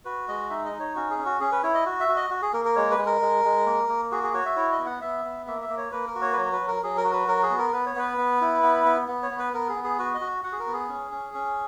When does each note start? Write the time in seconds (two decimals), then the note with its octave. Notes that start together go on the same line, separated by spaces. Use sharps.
0.05 F#4 B4
0.28 G#3 D#5
0.50 D#4 E5
0.65 D#5
0.73 D#4
0.80 C#5
0.95 C#4 F#4
1.10 G#4
1.19 C#4
1.26 F#4
1.40 C#4 G#4
1.52 B4
1.63 E4 C#5
1.74 D#5
1.86 F#4
2.00 E5
2.09 F#4
2.16 D#5
2.30 F#4
2.42 G#4
2.53 A#3 A#4
2.65 A#4
2.76 G#3 C#5
2.91 B4
2.98 G#3
3.06 A#4
3.21 G#3
3.44 G#3
3.66 A#3
3.89 A#3
4.11 F#4 G#4
4.23 G#4
4.34 F#4 C#5
4.45 E5
4.56 E4 C#5
4.72 D#5
4.79 B3
4.86 F#5
5.01 B3 E5
5.25 B3
5.47 A#3 E5
5.62 E5
5.69 A#3
5.77 C#5
5.92 A#3 B4
6.07 A#4
6.15 F#4
6.22 C#5
6.33 B4
6.37 F#3 C#5
6.52 B4
6.61 F#3
6.68 A#4
6.83 F#3 G#4
6.97 A#4
7.05 F#4
7.13 B4
7.28 F#3 A#4
7.43 G#4
7.50 B3
7.58 A#4
7.73 B3 B4
7.86 C#5
7.96 B3 B4
8.18 B3
8.41 E4
8.63 B3
8.85 B3
9.08 B3
9.23 C#5
9.31 B3
9.39 B4
9.53 B3 A#4
9.69 G#4
9.76 B3
9.84 G#4
9.99 F#4 B4
10.14 D#5
10.21 F#4
10.44 F#4 F#5
10.52 G#4
10.60 A#4
10.67 B3
10.73 G#4
10.89 C#4
11.11 C#4
11.34 C#4